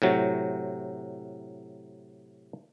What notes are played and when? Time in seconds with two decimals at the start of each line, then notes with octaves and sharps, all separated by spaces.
0.02 A2 C3 F#3